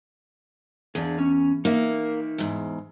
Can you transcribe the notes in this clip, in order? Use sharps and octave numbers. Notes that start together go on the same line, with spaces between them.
E2 D4 G#4
C#4
A#3 D#4 A#4 E5
E2 G#2